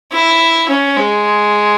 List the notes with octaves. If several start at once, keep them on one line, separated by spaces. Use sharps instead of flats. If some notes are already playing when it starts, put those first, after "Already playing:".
E4
C#4
G#3